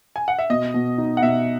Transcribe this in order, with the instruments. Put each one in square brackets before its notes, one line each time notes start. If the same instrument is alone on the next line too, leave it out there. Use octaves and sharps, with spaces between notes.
[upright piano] G#5
F#5
E5
[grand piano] B2 [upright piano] D#5
[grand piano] B2
D#4
[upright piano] F#5
[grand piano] B2 [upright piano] E5